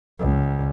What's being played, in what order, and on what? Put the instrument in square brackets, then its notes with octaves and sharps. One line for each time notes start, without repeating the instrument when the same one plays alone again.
[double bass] C#2